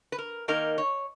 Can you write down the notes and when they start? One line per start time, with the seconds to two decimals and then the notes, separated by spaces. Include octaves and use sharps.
0.12 B4
0.18 A#4
0.48 D#3 A#3 D#4 A#4
0.78 C#5